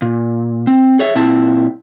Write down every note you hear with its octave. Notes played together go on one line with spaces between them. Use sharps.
A#2
C4
G#4 C#5 E5
A#2 C4 E4 A5